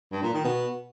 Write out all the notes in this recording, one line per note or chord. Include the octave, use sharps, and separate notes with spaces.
G2
A#2
D#3
B2